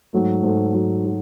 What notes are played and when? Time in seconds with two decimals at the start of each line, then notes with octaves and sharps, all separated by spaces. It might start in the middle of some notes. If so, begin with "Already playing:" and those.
0.13 G#2 F#3 A3
0.43 G#2 F#3 A3
0.73 G#2 F#3 A3
1.06 F#3